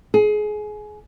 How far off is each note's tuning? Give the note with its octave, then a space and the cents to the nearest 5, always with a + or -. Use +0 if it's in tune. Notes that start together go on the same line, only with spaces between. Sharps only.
G#4 +25